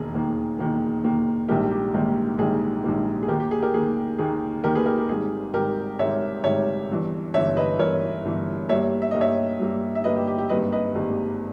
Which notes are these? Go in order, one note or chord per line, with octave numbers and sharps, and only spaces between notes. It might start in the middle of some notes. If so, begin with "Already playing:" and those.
Already playing: E1 D#2 D#3 A#3 G#4
E1 D#2 D#3 A#3
E1 D#2 D#3 A#3
E1 D#2 D#3 A#3
A#1 G#2 D#3 G3 A#3 G4 A#4
G4
A#1 G#2 D#3 G3 A#3
A#1 G#2 D#3 G3 A#3 G#4
A#1 G#2 D#3 G3 A#3
G#4
D#2 D#3 A#3 G4 A#4
G4
G#4
G4 A#4
D#2 D#3 A#3 G#4
D#2 D#3 A#3 G#4
D#2 D#3 A#3 G4 A#4
G#4 B4
G4 A#4
G4
G#1 G#2 G3 G#4
G#1 G#2 G3 G4 A#4
G#1 G#2 G3 C#5 E5
G#1 G#2 G3 C#5 E5
G1 G2 E3
G1 G2 E3 C#5 E5
B4 D#5
G1 G2 E3 A#4 C#5
G1 G2 E3
G2 G3 A#3 C#5 E5
E5
G2 G3 A#3 D#5
C#5 E5
G2 G3 A#3
E5
G2 G3 A#3 B4 D#5
G4
G4
G4
G#1 G2 G3 A#3 B4 D#5
B4 D#5
G#1 G2 G3 A#3